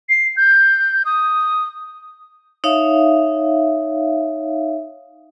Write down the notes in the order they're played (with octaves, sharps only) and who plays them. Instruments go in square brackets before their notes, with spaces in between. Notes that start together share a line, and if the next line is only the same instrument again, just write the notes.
[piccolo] C7
G6
D#6
[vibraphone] D#4 C#5 E5 F5